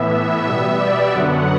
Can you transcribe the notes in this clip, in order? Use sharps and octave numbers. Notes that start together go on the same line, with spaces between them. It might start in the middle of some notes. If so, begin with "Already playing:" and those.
Already playing: A2 E3 B3 E5
B2 G3 B3 E5
D5
F#2 D3 F#3 B3 F#5